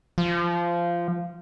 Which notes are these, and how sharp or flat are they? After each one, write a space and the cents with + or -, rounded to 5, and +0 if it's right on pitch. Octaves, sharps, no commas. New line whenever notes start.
F3 -15